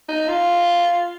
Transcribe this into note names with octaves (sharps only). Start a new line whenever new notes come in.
D#4
F4